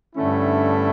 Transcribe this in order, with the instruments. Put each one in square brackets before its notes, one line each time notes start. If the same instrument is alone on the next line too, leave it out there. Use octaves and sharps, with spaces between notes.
[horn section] G2 D3 A3 C#4 E4